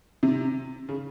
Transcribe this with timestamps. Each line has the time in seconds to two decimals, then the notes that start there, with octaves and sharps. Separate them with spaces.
0.23 C3
0.89 C#3